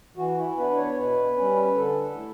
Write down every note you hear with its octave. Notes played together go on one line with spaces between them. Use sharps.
E3 F#4
E4
B3 D4 B4
C#5
B2 B4
G3 C#4
D3 A4
A3 E4